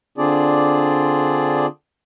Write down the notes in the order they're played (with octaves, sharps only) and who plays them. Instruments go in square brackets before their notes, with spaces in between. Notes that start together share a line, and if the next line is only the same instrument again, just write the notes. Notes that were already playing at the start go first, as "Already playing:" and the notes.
[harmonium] D3 C4 D4 F4 G#4 D5